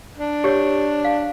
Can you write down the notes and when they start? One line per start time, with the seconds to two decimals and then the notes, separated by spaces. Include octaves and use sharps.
0.17 D4
0.44 G4 C#5
1.05 F5